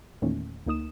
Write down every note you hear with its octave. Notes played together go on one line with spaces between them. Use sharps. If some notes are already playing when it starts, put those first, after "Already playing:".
E2 A#2 D#3 A3 C#4
D2 A#3 D#4 D#6 E7